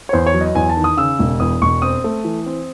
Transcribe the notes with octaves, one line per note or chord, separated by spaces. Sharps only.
C#5
E2 C5
C#5
F#3
D#5
E2 G#5
A5
D#3
D#6
C#3 E6
E1
E2 D#6
E1 C#6
C4 D#6
A3
E3
C4